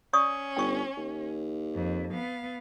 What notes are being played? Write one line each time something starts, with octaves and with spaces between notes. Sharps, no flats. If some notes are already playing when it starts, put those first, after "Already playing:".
C#4 D5 C#6 D#6
G1 G5 C#6
D#2
F2
B3 F5